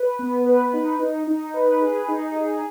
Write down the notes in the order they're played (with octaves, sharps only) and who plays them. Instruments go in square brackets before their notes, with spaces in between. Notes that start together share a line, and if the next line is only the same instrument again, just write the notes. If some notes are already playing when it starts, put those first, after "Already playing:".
Already playing: [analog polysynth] B4
B3
B4
D#4
D#4
D#4
B4
G#4
D#4
G#4